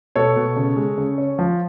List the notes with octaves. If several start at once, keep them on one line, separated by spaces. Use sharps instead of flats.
B2 A4 C#5
B2
C#3
G#3
C#3
C#4
F3